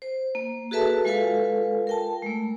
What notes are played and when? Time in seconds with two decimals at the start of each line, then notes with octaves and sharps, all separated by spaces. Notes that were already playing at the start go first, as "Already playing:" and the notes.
0.02 C5
0.35 A#3
0.71 F#4 G#4 A4 B4 E5 A5
1.05 G#3 F4 A4 B4 F5 G#5
1.87 A#4 G5 A5
2.22 G#3 A3